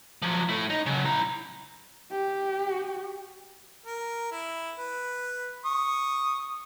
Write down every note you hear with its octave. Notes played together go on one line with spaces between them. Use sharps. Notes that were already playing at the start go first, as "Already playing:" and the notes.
F3 F#3
A3 E4
D#4
C#3 F#3
E4 A#5
G4
A#4
E4
B4
C#6 D#6